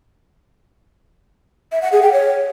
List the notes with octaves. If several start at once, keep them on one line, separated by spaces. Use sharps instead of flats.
E5
F#5
G#4
G5
C#5